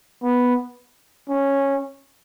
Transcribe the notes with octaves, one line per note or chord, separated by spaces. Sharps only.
B3
C#4